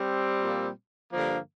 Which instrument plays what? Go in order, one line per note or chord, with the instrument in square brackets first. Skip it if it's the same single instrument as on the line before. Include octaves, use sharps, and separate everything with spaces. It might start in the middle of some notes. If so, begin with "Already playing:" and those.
Already playing: [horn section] G3 C4
A#2 F3
G2 D3 F3 A#3